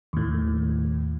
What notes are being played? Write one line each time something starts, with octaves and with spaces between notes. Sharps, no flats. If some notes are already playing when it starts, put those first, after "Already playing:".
D#2 A2